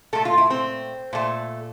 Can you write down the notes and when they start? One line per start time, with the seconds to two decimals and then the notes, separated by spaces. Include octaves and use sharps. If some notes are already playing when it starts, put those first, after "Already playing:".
0.13 A#2 A3 A4
0.25 F4
0.38 E4
0.50 C4
1.13 A#2 A3